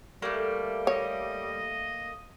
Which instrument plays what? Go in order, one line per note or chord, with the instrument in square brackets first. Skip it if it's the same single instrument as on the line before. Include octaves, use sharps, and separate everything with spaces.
[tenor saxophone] G3 [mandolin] A3 A#3
[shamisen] C#5 [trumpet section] D#5